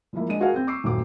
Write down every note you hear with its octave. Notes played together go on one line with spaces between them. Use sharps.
E3 F3 G#3 A#3 E4
G#3 D4 D#5 D#7
F#4 G#4 A#4 F5
C4 G6
C#6 D6 E6 C7
D#1 F#2 A3 D6